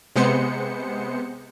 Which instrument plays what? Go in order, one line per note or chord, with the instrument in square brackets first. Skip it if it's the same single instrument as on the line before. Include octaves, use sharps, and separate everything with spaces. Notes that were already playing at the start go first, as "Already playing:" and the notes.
[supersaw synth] C3 G#3 B3 C5 C#7